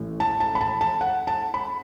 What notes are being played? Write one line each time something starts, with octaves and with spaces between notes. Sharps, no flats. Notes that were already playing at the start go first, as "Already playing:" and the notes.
Already playing: A1 A2 E3
A5
A5
B5
A5
A5
F#5
A5
B5